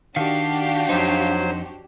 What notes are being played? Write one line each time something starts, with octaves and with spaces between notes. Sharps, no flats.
D#3 D4 F#4 G4 F5
F2 F#3 D#4 C5